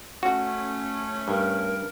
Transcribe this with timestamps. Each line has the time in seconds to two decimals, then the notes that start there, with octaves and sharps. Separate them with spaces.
0.23 A3 C#4 F#4
1.28 G2 A#4